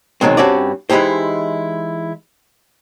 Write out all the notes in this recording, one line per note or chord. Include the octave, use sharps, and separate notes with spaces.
B2 D#3 F#3 G#3 C4
G2 C4 C#4 F#4 D5
E3 G#3 D#4 E4 G4 C5